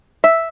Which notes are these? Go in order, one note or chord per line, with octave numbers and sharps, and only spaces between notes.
E5